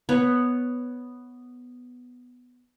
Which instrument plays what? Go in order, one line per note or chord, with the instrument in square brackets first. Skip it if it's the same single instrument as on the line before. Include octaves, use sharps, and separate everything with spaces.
[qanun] B3 C#5